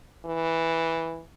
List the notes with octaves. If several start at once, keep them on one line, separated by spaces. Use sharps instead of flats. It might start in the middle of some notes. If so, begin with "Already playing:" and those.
E3